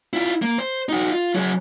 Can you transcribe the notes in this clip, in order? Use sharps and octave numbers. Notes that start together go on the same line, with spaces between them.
E4 F4
A#3
C5
D#4 F#4
F4
F#3 G#4